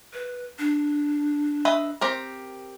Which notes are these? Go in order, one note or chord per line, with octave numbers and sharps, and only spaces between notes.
B4
D4
B4 D#5 E5
C4 G4 A#4